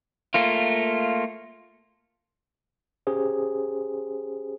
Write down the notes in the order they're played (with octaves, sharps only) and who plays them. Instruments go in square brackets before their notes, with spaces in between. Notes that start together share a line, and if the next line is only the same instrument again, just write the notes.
[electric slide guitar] A3 A#3 F4
[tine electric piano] C#4 G4 G#4 C5